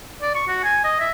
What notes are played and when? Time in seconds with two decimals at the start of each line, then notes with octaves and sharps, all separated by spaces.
0.22 D5
0.34 C#6
0.48 F#4
0.64 G#5
0.84 D#5
1.00 E5